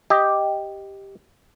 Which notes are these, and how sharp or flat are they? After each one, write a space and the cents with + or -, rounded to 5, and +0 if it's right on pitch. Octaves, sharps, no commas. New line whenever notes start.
G4 +0 D#5 +0